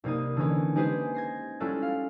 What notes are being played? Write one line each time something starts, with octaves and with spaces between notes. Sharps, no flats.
C2 C3 A#3 D#4 D#6
D3 E3 C#4 D#4
G#3 D#4 G4 G#4 B4 C5
G#6 A#6 C7
G3 C#4 E4 F4 A4 F#6
F5